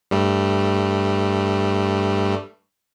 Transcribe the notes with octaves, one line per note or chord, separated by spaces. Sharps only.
G2 G3 A3